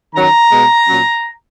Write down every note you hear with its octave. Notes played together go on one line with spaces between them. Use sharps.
D#3 F#3 C#4 A#5
B2 G#3 B3
A#2 F#3 C#4